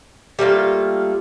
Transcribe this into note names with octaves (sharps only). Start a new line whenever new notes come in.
G3 A3 A#3 F4